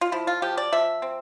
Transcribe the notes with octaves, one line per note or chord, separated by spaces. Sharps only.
F4
F3 E4
F4
F3 G4
D5
F3 E5
C4